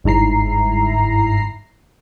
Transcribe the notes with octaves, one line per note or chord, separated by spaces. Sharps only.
G1 G#2 E4 A#5 C7